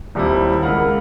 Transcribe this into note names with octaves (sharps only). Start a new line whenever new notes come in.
D#1 D#2 G3 C4 E4
C#2 A#3 A#4 F5 F#5 B5